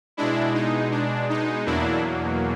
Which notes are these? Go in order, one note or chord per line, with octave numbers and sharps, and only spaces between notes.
B2 G#3 D4 E4
D#4
D4
D#4
E2 B2 F#3 A#3 D4 E4